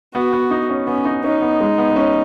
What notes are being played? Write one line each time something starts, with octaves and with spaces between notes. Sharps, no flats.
B3 F#4
B3
D#4
C#4
B3 C#4
D#4
C#4 D#4
B3
G#3
B3
B3
C#4